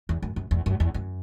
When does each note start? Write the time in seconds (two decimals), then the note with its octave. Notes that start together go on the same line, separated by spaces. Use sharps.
0.09 E2
0.22 F#2
0.36 F#2
0.51 E2
0.66 F#2
0.80 E2
0.94 F#2